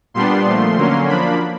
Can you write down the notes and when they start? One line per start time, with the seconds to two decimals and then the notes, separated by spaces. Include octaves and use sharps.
0.14 A#2 G3 B3 D4 C6
0.45 A#2 F3 A3
0.76 D3 F#3 A#3 C#4
1.08 F3 A#3 D4 B5